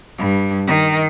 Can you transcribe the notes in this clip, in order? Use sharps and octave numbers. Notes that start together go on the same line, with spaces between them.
G2
D#3